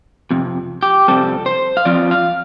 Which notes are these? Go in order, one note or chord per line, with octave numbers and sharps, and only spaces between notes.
F2 C3
G4
F2 C3 G3 C4 A4
C5
F5
F2 F3 C4 F4 D5
F5